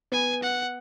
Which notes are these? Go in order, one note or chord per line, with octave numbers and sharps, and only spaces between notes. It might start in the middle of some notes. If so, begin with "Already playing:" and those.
B3 G#5
F#5